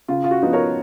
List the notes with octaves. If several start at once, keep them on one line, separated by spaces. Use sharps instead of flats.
C#3 F4
F4
F#4
F3 B3 D#4
A#4 C#5